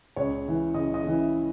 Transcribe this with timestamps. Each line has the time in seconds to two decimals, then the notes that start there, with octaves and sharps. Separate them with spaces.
0.16 C#2 C#5
0.46 C#3 E3
0.74 C#2 D#5
0.94 D#5
1.03 C#3 E3
1.13 E5